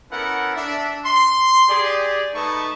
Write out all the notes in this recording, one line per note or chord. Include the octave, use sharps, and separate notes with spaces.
B3 C#4 E4 A4 A#4 F#5
D4 E5
C6
G4 G#4 D5
A3 D#4 B4 D#5 A5 C#6